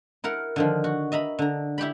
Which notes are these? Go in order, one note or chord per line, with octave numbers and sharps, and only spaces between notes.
E4 A#4 F#5 A#5
D3 D#3 F3
F#4
D#5 E5 A#5 B5
D3 A#5
E4 G4 G5 B5